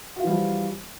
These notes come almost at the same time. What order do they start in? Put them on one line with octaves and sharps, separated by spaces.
F#4 F4 E3 G3 F3